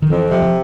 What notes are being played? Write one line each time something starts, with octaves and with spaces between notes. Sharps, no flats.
D#3
F2 E3
C3 F3
F3